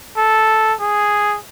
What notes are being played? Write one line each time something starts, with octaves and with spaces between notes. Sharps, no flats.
A4
G#4